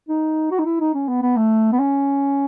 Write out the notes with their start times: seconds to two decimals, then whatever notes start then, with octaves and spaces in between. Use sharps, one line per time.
0.09 D#4
0.51 F#4
0.59 D#4
0.65 E4
0.80 D#4
0.94 C#4
1.08 B3
1.22 B3
1.37 A3
1.72 B3
1.79 C#4